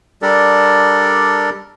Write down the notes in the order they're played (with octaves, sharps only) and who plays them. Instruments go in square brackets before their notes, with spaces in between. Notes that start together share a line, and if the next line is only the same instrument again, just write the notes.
[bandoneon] G3 D4 G4 A4 A#4 D5